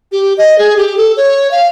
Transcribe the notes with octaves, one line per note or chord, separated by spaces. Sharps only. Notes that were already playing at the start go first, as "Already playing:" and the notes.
G4
D#5
G#4
G4
A4
C#5
F5